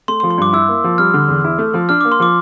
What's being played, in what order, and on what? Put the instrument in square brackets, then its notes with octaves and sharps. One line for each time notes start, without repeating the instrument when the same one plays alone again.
[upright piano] A3 [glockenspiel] C6
[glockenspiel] C6
[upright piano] F3
[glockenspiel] C6
[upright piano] G2 [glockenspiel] D6
[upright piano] E4 [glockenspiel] E6
[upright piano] A#3
F3
[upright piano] G3 [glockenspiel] F6
[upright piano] D3
E2
E4
A3
F3
[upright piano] D4 [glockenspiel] F6
[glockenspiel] D6
[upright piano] A#3
[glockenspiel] C6
[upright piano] F3 [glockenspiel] D6